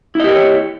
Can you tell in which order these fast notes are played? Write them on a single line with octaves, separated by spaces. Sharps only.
E4 D#5 G4 A#4 C#5